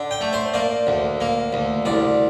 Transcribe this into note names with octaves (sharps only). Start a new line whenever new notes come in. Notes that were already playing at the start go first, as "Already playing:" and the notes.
Already playing: D3
G5
A3
C5
A#3 D5
D2
A#3
D2
C2 D5